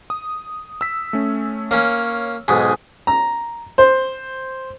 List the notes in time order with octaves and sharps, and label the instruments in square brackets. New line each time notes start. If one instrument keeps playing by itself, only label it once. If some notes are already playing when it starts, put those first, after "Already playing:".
[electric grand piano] D#6
E6 B6
A3 C#4
[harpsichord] A#3 C#4 [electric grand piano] C#5
[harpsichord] B1 G#2 [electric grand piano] G#5 D#6
[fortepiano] A#5
C5